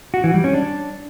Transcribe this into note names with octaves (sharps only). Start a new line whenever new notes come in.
F#4
E3
G3
C#4
D4